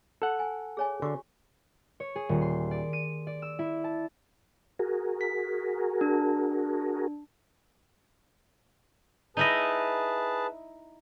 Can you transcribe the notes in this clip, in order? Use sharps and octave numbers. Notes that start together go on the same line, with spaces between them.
A4 F#5
G#5
G#4 C#5 G#5
D3 F#4 C#6
C#5
G#4
D#1
C6
D5
D#7
D5
E6
E4
A5
F#4 G#4 A#4
B6
D4
D#4 E4 G#4 B4 D#5 A5